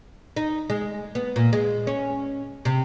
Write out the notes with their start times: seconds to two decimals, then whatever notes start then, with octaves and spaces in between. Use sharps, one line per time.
0.36 D#4
0.70 G#3
1.15 B3
1.36 A#2
1.53 G#3
1.87 C#4
2.65 C3